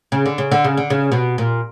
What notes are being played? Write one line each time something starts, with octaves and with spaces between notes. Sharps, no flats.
C#3
D3
C#3
D3
C#3
D3
C#3
B2
A#2